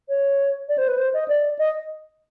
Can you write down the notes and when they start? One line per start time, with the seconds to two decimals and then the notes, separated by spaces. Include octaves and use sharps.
0.09 C#5
0.69 D5
0.78 C5
0.88 B4
0.98 C5
1.14 D#5
1.28 D5
1.59 D#5